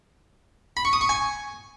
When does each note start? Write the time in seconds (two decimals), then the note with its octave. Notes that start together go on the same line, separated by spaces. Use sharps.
0.77 B5
0.85 C#6
0.93 D#6
1.01 C#6
1.09 G#5